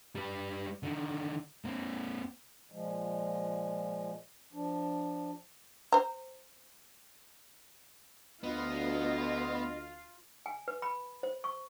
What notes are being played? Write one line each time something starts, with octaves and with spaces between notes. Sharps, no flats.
G3 B4
D3 D#3
A#3 C4
A#2 F3 G#3
F3 D4
C5 A#5
D2 B3 F4 D#5
G#5
B4
B5
C5
C#6